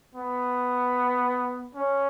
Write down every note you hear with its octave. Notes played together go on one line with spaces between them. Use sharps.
B3
C#4